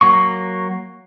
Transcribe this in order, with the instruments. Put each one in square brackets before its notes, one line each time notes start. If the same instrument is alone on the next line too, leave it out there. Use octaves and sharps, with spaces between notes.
[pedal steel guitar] F#3 A#3 C#6